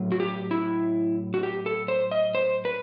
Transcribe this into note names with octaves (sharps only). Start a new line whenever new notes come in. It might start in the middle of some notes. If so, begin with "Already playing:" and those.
Already playing: A2 F#3
F#4
G4
E4
F#4
G4
A4
C5
D#5
C5
B4